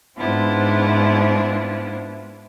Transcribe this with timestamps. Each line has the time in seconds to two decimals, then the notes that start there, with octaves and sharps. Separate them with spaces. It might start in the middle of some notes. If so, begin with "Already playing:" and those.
0.16 G#2 B3 C4 D4 E4 F4